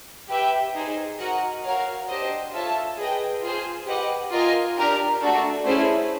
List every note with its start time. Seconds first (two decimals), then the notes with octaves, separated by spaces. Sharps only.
0.29 G4 B4 E5 G5
0.75 D#4 G#4 C5
1.18 F#4 A#4 D#5 F#5
1.64 F#4 A#4 C#5 F5
2.09 D4 G4 C5 D#5
2.52 F4 A4 C#5 E5 A5
2.97 G#4 B4 D#5 G5
3.42 F4 G#4 C5
3.87 G4 B4 D#5 F#5
4.31 F4 A#4 D#5 G#5
4.77 D4 G4 A#4
5.21 A3 D4 F#4 A4
5.65 A3 C#4 E4 G#4 C5